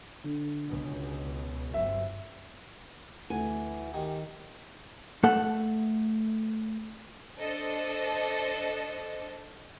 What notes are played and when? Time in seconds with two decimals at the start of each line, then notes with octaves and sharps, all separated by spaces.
0.24 D3
0.67 C#2 B2
1.74 G1 F#3 C4 E5
3.30 D2 E3 A4 F#5 G#5
3.94 D#3 G4
5.23 A3 A4 F#5
7.39 D4 A4 C5 D#5